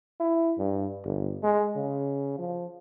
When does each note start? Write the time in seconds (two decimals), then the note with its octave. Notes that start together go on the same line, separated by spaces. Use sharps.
0.20 E4
0.58 G2
1.05 G1
1.43 G#3
1.76 C#3
2.39 F3